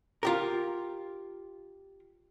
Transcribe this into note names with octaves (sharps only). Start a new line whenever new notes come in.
F4 G4 A#4